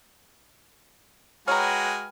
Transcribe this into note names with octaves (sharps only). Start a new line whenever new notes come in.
G#3 F#4 B4 C#5 G5 G#5 A#5 F6